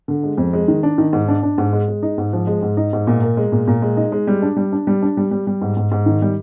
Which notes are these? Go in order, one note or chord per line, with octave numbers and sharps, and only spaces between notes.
D3
G#3
F2
G#3
D#3
D4
D#3
G#2
D4
D4
G#2
G#3
G#3
D#4
G#2
F3
G#3
G#2
D#4
G#2
A#2
A#4
G#3
A#2
A#2
G#3
D#4
G#3
G3
D4
G3
D4
G3
D4
G3
G3
G3
G#2
G#2
G#2
D#3
G3